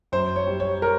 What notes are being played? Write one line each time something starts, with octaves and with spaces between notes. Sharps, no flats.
F#2 C5
C#5
G3
C#5
A#4